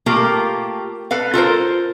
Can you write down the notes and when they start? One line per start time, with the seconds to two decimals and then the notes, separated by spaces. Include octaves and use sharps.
0.06 A3 A#3 F4 G4
1.11 A4 B4 F5
1.34 F4 A4 A#4 C5